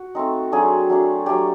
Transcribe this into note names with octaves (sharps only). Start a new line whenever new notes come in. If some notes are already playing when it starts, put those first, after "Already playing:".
Already playing: F#4
A3 C4 D#4
F#3 A3 D4 G#4
F#3 A3 D4
F#3 A3 D4 G4